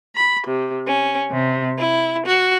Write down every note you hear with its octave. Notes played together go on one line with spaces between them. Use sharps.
B5
C3
C#4
C3
E4
F#4